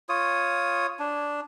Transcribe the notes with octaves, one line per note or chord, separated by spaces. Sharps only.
F4 C#5 D#6
D4